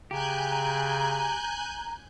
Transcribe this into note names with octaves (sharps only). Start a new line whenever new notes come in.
C#3 G4 G#5 A#5 F#6 G6